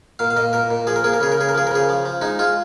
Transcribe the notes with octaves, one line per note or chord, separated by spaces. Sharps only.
A#2 F5
F5
A#2 D#5
A#2 A#4
A#2
F3 G#4
A#4
A#3 G#4
A#4
C#3 G#4
A#4
C#3 G#4
A#4
F3 G#4
A#4
C#3 G#4
F3
F3
G#3 D#4
G#3 F4